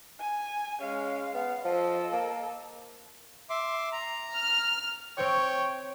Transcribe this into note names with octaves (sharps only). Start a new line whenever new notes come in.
G#5
G#3 C#4 F5
B3 F5
F3 A4 D#5
A#3
E5 C6 D6
A#5
F6
C4 C5 C#5 G5 C#6